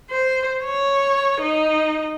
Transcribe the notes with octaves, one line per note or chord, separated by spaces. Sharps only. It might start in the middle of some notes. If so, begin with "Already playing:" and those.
C5
C#5
D#4